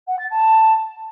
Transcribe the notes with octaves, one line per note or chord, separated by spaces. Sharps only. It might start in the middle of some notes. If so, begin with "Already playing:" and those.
F#5
A6
A5